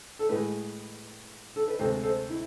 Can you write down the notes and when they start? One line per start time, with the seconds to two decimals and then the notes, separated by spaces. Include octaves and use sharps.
0.19 A4
0.29 A2 G#3 G#4 B4
1.56 A4
1.68 B4
1.79 D2 C3 G#3 A4 C5
2.03 A4 C5
2.29 E4